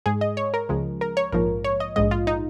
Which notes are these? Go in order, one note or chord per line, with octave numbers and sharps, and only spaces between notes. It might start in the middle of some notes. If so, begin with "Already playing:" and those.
G#2 G#3 G#4
D#5
C#5
A#4
C#2 C#3 F3 G#3
A#4
C#5
A#1 G#2 F3 A#3 A#4
C#5
D#5
A#1 G#2 G#3 D#5
F4
D#4